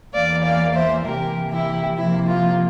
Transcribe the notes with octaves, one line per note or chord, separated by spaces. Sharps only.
E2 E3 A#3 D5 F5
D5 F5
C5 E5
C3 E3 A#3 G4 A#4
E4 G4
C3 F3 A#3 E4
F4